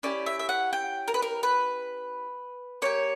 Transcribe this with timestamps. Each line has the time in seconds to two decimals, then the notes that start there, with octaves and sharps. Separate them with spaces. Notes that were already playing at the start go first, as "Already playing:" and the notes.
0.03 C#4 E4 G4 D5
0.26 E5
0.39 E5
0.49 F#5
0.73 G5
1.08 A#4
1.14 B4
1.22 A#4
1.43 B4
2.82 A#3 D4 G4 C#5